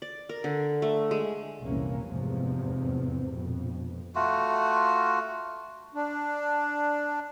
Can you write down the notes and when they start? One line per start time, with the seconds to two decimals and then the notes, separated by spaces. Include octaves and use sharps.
0.02 D5
0.29 A#4
0.44 D3
0.82 A3
1.11 G#3
1.61 F1 C2 A#2 E3 A#3 C#4
2.05 F1 E2 G#2 C3 F3
3.32 A#1 F2 B2
4.15 A3 F4 F#4
5.95 D4